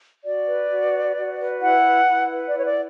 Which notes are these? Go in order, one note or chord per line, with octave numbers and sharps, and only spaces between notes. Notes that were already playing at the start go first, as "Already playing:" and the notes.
F#4 D5
B4
F#4
B4
F#4
B4
E4 F#5
B4
E4
B4
D5
E4 C#5
D5